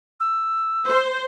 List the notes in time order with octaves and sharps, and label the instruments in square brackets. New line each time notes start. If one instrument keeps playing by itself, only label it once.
[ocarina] E6
[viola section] C5